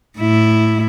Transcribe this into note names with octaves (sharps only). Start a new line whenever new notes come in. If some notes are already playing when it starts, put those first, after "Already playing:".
A2 E4